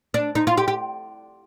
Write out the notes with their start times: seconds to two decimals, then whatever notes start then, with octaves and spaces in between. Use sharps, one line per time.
0.14 D4
0.35 D#4
0.47 F4
0.58 G4
0.68 G4